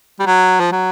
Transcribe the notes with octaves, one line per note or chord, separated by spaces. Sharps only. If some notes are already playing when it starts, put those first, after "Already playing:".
G3
F#3
F3
F#3